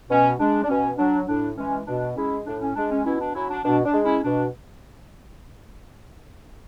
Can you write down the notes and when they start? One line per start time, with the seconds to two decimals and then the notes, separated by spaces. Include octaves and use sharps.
0.10 B2 C#4
0.39 G#3 D4
0.63 D4
0.69 B2 C#4
0.98 F#3 D4
1.28 A2 D4
1.58 E3 G#3 C#4
1.87 B2 D4
2.16 G#3 C#4 E4
2.46 A2 D4
2.61 C#4
2.76 G#3 D4
2.91 C#4
3.05 B2 C#4 E4
3.21 D4
3.35 F#3 C#4 E4
3.50 D4
3.64 B2 D4
3.85 D4
3.94 G#3
4.04 C#4 E4
4.24 B2 D4